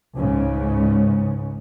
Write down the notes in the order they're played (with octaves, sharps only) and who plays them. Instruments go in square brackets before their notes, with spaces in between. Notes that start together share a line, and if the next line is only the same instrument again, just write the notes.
[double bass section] C#2 G#2 C#3 C#4